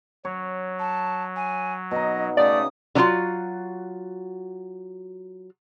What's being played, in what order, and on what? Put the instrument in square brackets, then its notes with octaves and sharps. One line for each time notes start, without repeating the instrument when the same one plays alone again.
[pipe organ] F#3 [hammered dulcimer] C#5
[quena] A5
G#5
[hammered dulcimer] B2 D#4 [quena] D#5
[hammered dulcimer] C#3 [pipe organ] A3 [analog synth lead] D5 [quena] D#6
[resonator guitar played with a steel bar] D3 F#3 A3 F4 F#4